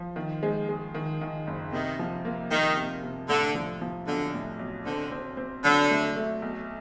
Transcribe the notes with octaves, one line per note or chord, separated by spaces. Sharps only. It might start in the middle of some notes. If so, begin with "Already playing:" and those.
Already playing: F3
D#3
G#3
G#3
D#3
D#3
F#1
C3 D#3
F3
A#3
D#3 A#3
C3
C3
A2 D3
F3
F3
B1 D3
A2
B1
D3 C4
C4
C4
D3 F#3
A3
A3
B1